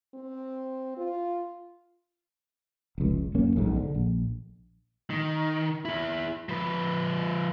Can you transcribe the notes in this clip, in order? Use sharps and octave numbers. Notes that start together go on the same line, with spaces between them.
C4
F4
F1 C#2
F#2 A#3 C#4
B1 F2 G#2 G#3
D3
A#1
D#3
E4 G#4
F3 B4